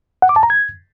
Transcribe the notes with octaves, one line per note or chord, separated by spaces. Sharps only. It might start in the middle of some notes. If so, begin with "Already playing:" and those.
F#5
D6
A5
A#5
G#6